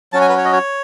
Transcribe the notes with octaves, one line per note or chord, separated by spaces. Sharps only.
F#3 C#4 F#4 A5
G#5
B4
C#5
D#5
C#5